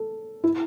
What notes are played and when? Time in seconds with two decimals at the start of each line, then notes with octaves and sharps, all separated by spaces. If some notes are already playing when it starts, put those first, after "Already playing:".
Already playing: A4
0.44 E4